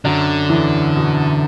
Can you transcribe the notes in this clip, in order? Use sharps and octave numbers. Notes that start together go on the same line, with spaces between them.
F#2 D3 F#3
E2 E3
B2